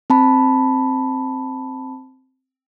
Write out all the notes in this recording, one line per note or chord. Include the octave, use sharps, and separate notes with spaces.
C4 A5 B5